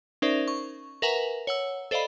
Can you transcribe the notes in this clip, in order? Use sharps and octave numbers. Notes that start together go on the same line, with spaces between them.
C#4 D#4 A#4 C5 D5 E5
C#6
A#4 B4 E5 F#5 G#5 A#5
C#5 F#5 E6
A4 C5 D5 D#5 F5 B5